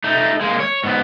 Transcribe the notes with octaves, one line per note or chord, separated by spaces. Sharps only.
A3 D#4
G#3 A#3
C#5
G#2 B3